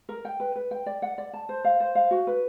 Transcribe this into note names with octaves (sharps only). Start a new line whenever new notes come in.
A#4
G5
B4
B4
G5
D5
F#5
D5
A5
C5
F5
C5
F5
F#4
B4